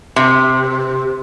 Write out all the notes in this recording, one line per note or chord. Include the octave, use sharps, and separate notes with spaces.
C3